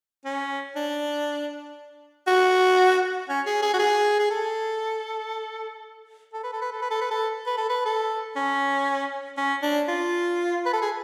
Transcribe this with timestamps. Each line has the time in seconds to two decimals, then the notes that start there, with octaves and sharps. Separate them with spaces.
0.25 C#4
0.76 D4
2.27 F#4
3.29 C#4
3.46 G#4
3.62 G#4
3.73 F#4
3.79 G#4
4.19 G#4
4.30 A4
6.33 A4
6.43 B4
6.53 A4
6.61 B4
6.72 A4
6.82 B4
6.91 A4
7.01 B4
7.11 A4
7.46 B4
7.58 A4
7.69 B4
7.85 A4
8.36 C#4
9.37 C#4
9.62 D4
9.88 F4
10.65 B4
10.73 A4
10.82 G#4